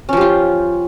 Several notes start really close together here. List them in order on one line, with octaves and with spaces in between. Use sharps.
C#4 F3 G4 F4